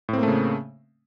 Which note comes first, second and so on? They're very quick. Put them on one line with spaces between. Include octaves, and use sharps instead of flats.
A2 C4 A#3 A3 C#3